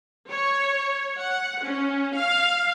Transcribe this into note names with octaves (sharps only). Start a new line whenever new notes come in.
C#5
F#5
C#4
F5